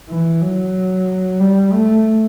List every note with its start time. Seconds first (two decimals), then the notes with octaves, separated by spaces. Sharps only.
0.09 E3
0.42 F#3
1.40 G3
1.73 A3